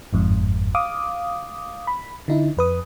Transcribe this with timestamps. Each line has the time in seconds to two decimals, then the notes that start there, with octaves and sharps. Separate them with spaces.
0.13 G1 F2 G#2
0.75 F5 D6 D#6
1.87 B5
2.28 D3 D#4 E4
2.57 F2 B4 D#6